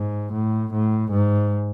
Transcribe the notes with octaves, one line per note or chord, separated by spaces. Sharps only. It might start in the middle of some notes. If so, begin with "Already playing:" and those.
Already playing: G#2
A2
A2
G#2